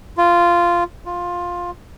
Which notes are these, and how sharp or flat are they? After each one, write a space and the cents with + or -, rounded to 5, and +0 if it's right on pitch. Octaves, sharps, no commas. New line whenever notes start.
F4 -10
F4 +10